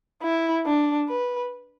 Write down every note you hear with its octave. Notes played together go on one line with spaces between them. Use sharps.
E4
D4
B4